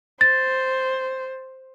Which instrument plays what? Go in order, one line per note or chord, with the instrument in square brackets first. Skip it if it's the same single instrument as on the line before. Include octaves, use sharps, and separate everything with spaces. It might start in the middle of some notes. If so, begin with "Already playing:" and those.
[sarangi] C5 [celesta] A6